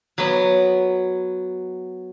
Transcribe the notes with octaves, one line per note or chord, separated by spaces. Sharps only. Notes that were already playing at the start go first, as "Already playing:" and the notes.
F#3 B3